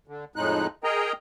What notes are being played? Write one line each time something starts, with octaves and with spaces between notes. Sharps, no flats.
D3
F2 A2 G#3 D#4 F#6
G#4 A#4 D#5 G5 A#5